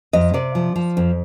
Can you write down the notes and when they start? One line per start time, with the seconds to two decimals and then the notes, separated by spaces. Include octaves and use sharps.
0.13 F2 D#5
0.34 C3 D5
0.55 F3
0.76 F3
0.97 F2